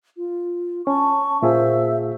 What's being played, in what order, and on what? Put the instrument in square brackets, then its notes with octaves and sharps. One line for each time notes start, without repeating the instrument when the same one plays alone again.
[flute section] F4
[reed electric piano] C#4 [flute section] A5 C#6
[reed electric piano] A#2 F4 G#4 [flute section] C5 E5 E6